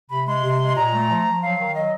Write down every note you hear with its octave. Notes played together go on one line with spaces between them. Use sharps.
C3 B5
G#3 C6
C3
G#3
A#2 A#5
A3
F3
F3
F#3 F5
D#3
F#3 D#5